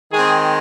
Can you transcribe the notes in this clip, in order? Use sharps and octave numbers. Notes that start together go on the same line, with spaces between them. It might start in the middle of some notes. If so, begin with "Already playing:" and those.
D#3 G#3 C4 G#4